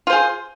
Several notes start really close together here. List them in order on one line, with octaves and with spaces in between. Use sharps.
F4 C5 G#4